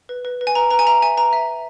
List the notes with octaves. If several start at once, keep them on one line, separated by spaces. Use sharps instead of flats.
B4
B4
B4
G#5
B4 A#5
B4 A#5
G#5
E5 A#5
E5 G#5
B4 A#5
E5
E5